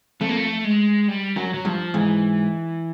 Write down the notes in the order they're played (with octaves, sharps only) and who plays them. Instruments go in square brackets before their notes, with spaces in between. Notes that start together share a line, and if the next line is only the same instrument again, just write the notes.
[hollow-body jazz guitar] F2 [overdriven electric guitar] A3
[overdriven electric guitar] A#3
A3
G#3
G3
[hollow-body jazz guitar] F#2 [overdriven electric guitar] F#3
[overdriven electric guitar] F#3
[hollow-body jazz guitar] G2 [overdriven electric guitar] F3
[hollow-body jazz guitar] G#2 [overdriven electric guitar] E3